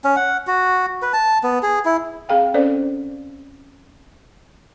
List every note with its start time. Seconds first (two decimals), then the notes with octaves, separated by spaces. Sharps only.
0.04 C#4
0.16 F#5
0.47 F#4
1.02 B4
1.13 A5
1.43 B3
1.63 G#4
1.85 E4
2.29 C4 G#4 F5 G5
2.54 C4 C#4 A4 C5 D5